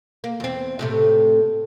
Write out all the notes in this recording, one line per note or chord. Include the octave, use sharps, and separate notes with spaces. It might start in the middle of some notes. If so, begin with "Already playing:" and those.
A#3
E2 C4
A2 C3 A3